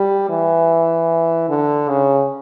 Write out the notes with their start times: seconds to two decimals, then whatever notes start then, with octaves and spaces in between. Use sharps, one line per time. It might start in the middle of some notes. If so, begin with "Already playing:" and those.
Already playing: G3
0.29 E3
1.49 D3
1.89 C#3